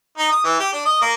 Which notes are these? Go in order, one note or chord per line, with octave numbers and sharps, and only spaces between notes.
D#4
D#6
E3
G4
D4
D#5
A#3